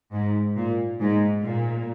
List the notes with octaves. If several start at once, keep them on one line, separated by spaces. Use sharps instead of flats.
G#2
A#2
G#2
A#2